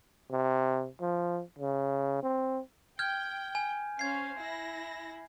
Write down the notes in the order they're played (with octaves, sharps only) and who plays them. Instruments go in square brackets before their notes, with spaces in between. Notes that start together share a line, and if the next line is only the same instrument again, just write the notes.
[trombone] C3
F3
C#3
C4
[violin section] G5 [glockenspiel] F6 G6 G#6
[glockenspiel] G#5
[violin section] C#4 C5 F5 [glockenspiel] G#6 C7
[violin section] E4 A#6